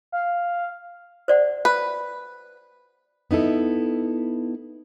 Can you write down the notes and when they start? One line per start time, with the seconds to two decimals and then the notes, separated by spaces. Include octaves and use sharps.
0.12 F5
1.28 C5 D5 F#5
1.65 B4
3.31 B3 D#4 E4 A4